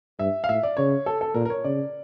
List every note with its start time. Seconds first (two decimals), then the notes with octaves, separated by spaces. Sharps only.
0.19 G2 E5
0.44 F5
0.48 A2 E5
0.63 D5
0.77 C#3 C#5
1.06 A4
1.21 A4
1.34 A#2 A#4
1.45 A#4
1.50 C#5
1.64 C#3 D5